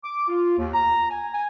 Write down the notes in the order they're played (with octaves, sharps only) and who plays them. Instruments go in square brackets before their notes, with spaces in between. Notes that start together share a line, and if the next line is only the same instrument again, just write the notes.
[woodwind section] D6
F4
D#2
A#5
G#5
G#5